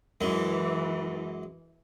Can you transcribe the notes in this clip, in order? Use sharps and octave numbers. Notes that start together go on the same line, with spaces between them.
F#2 E3 G#3